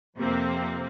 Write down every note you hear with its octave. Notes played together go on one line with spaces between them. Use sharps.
F2 C3 A#3 C4